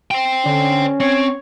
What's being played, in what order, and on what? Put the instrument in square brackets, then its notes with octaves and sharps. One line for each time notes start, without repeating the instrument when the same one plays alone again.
[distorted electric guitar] C5 G5
[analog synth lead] D3 [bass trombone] C#4
[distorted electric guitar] C4 [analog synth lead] C#5